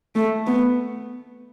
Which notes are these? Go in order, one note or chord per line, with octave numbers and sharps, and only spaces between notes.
A3
B3